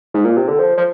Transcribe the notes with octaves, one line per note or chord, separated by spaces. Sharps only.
G#2
A#2
C3
D3
F3
F3